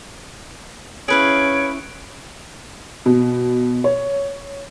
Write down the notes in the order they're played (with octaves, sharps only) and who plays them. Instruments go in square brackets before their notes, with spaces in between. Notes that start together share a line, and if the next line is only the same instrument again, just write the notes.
[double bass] C#4 E4 [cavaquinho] G#4 B4 F5 [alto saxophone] C#5 [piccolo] D7
[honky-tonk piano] B2
C#5